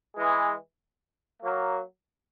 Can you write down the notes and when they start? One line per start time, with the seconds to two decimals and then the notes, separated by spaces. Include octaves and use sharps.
0.17 E3 G#3
1.42 F#3 A#3